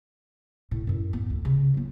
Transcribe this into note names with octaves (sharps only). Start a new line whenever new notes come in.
A2
F#2 A2
B3
D2
C#3
F#3 B3